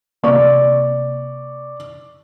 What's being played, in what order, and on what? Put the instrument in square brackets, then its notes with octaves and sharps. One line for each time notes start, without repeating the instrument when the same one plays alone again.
[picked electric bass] C3 A#3 [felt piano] D5 C#6